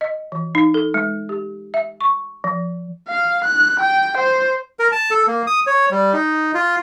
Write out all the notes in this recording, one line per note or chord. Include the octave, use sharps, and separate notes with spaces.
D#5
E3
D#4
A4
G#3
G4
E5
C#6
F3
F5
F#6
G5
C5
A#4
A5
A4
A#3
D#6
C#5
G3
D#4
F4